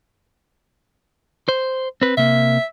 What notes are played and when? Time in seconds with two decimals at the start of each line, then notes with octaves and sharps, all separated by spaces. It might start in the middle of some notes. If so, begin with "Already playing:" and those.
1.49 C5
2.01 C4 B4
2.17 C3 A#3 E5